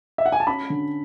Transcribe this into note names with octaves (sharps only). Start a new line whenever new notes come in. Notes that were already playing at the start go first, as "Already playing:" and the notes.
E5
F#5
G#5
A5
C#4 B5
D3